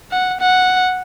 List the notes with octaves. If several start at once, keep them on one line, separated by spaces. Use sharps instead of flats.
F#5
F#5